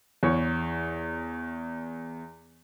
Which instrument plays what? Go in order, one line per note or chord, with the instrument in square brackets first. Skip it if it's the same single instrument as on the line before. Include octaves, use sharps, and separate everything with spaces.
[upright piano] E2 C#5